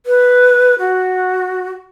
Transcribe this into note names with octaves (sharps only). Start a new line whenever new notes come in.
B4
F#4